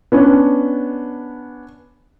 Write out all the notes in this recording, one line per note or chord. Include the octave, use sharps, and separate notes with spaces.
B3 C#4 D4